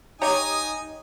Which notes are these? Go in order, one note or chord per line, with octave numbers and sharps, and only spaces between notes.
D#4 G4 C#5 D#5 G#5 A#5 D#6